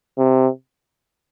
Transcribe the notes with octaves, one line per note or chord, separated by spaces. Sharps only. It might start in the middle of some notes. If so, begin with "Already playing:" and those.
C3